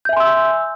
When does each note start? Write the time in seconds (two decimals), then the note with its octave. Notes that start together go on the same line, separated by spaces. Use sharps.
0.05 G6
0.09 E5
0.13 G#5
0.16 C6
0.20 E6